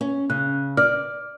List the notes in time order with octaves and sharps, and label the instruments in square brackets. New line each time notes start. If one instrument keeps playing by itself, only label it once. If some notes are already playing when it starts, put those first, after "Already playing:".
[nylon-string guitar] C#4
[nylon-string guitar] C#3 [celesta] F#6
[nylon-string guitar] D5 [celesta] F6